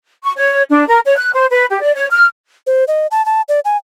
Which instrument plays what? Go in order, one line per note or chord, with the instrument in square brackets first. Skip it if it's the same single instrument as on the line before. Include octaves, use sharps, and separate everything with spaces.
[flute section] C#6
C#5
D4
A#4
C#5
F#6
C5
B4
G4
D5
C#5
F6
[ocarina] C5
D#5
A5
A5
D5
G#5